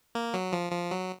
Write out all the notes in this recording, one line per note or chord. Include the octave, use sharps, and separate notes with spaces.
A#3
F#3
F3
F3
F#3